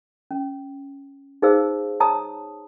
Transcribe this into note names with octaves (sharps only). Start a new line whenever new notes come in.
C#4
D#4 G#4 B4 C5 F5 E6
C#5 A5 A#5 D#6